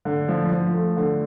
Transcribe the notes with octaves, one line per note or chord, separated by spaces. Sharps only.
D3
F3
F3
A3
D3